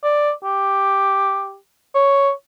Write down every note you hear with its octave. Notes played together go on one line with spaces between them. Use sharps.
D5
G4
C#5